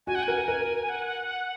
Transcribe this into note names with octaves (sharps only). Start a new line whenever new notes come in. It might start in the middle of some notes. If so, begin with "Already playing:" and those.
F#4 G#5
F#5
A#4 G#5
A#4
F#5